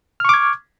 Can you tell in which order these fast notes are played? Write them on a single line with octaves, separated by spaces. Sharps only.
F6 C#6 D6 G#6